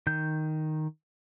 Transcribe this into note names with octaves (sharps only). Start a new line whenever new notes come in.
D#3 G6